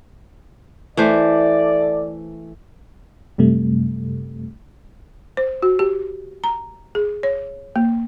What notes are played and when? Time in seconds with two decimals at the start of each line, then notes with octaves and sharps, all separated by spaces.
0.97 E3 A3 A4 C5 D5
3.38 F#2 C3 G3 A3
5.37 C5
5.62 F#4
5.79 G4
6.44 A#5
6.95 G#4
7.23 C#5
7.76 A#3